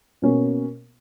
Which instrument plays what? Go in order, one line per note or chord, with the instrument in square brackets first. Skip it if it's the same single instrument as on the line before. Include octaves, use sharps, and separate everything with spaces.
[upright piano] B2 A#3 C#4